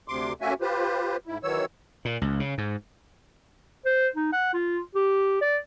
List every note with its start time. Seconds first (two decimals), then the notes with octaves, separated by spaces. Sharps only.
0.08 D2 C3 C6 D6
0.41 A3 A#3 C#4 F#4 E5 G#5
0.61 F4 G4 B4 C5
1.27 G#2 E4
1.43 D#3 E3 F#3 C#5 E6
2.05 A#2
2.21 C#2
2.40 C#3
2.58 G#2
3.85 C5
4.16 D#4
4.33 F#5
4.53 F4
4.95 G4
5.41 D5